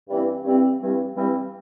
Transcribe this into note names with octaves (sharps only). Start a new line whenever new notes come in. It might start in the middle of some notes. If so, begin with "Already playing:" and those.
G2 E3 G3 C4
G2 E3 G3 C4
G2 E3 G3 C4
G2 E3 G3 C4